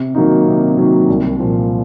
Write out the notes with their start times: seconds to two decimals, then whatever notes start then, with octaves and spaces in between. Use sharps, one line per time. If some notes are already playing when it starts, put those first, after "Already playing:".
Already playing: C3
0.15 D#3 F#3 A#3 D#4
0.46 C3
0.77 D#3 F#3 A#3 D#4
1.08 C2
1.39 A#2 F3